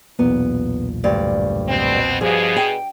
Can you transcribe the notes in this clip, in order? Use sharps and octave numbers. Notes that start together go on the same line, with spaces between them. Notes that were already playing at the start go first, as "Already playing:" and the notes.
B1 E2 A#2 B3
D2 G2 D5
B2 C4
G2 B2 F3 G#4
G5